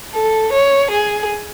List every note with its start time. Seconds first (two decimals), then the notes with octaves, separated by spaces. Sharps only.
0.14 A4
0.53 C#5
0.91 G#4